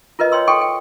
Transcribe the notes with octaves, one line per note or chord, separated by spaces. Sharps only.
F4 A#4 B4 D#5
C#5 G5 C6 E6
A4 G5 C6 C#6
G5